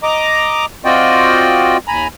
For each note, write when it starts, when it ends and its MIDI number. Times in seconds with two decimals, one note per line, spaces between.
0.03 0.66 75
0.03 0.66 82
0.03 0.66 86
0.85 1.77 60
0.85 1.77 65
0.85 1.77 66
0.85 1.77 74
0.85 1.77 75
0.85 1.77 79
1.88 2.08 39
1.88 2.08 80
1.88 2.08 82
1.88 2.08 83